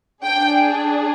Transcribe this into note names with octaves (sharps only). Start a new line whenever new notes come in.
D4 G#4 G5